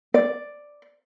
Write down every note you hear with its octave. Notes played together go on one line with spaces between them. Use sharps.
D5